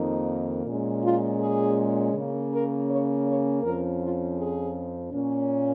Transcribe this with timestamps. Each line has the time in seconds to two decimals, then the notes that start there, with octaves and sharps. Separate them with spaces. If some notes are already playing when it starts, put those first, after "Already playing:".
Already playing: F2 D#3 A#3 D#4
0.66 A#2 G#3 C#4
1.03 F4
1.40 G#4
2.14 C#3 A#3 C#4
2.52 A#4
2.89 C#5
3.26 C#5
3.63 F2 F3 C#4 A#4
4.01 F4
4.38 G#4
5.12 A#2 A#3 C#4